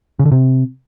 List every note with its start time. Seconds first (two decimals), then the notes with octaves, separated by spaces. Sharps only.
0.19 C#3
0.26 D3
0.32 C3